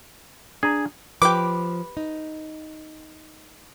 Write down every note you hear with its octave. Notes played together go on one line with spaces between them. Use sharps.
D4 G#4 G#5 A#5
F3 G4 B4 D6
D#4